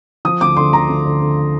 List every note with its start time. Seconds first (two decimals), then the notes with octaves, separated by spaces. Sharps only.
0.25 F3 D#6
0.41 D2 D6
0.57 D3 C6
0.73 D2 A#5
0.89 D2
1.05 D3
1.21 D3